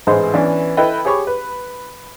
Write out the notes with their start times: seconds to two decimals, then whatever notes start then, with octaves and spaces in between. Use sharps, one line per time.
0.07 A1 G#2 E3 G#3 C5 D#5
0.34 E3 B3 C#4 D4
0.77 E4 A4 B4 D#5 G5
1.05 G4 G#4 C#5 B5 C#6 D6
1.27 B4